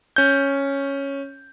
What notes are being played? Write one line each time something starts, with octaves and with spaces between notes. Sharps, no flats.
C#4 G6